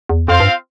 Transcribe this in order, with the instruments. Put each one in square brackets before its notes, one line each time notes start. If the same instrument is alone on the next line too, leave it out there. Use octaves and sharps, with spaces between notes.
[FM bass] E2
[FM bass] F2 [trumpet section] C4 F4 C5 F5
[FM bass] G2